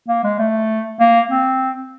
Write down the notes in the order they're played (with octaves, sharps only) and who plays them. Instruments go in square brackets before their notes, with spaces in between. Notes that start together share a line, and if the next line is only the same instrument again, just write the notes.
[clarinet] A#3
G#3
A3
A#3
C4